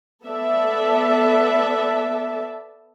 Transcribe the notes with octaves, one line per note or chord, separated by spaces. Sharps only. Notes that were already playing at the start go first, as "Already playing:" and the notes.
B3 A4 D5 E5 A5